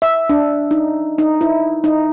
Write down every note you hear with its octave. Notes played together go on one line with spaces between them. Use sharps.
E5
D4
D#4
D#4
E4
D#4